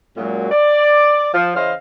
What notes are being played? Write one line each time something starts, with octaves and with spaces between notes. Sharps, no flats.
F#2 A#2 F#3 G#3
D5
F3
C#3 E3 C5 D#5 F5